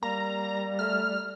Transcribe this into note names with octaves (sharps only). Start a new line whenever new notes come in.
G3 A#3 A#5
A3 F6